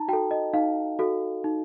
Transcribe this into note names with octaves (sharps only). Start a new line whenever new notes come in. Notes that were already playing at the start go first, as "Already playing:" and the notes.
Already playing: D#4 A5 A#5
F#4 A4 G5
D#5
D#4 F5
F#4 A4
D#4